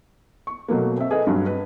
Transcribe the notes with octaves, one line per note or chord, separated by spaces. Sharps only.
C#6
B2 F#3 A3 A#3
C4 E5
G#4 A4 B4 D#5
G2 F#3
B4